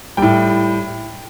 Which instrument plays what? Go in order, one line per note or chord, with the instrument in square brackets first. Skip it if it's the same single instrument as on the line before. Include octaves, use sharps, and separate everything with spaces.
[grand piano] A2 G3 G5